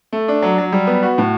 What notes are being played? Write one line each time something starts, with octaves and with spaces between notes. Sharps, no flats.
A3
D4
F#3
F#3
G3
B3
F#4
A2